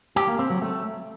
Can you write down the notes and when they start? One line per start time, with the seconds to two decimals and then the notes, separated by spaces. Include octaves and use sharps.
0.16 G4
0.28 A#3
0.39 C4
0.50 F#3
0.62 A3